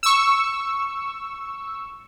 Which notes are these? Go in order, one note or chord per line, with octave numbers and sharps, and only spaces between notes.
C#6 E6